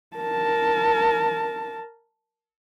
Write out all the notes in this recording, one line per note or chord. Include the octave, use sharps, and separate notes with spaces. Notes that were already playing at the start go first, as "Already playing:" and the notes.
A#4 A5